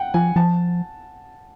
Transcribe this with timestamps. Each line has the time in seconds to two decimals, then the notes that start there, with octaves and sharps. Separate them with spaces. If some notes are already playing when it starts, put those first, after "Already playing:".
Already playing: F#5 G5
0.14 F3 G#5
0.36 F3 A5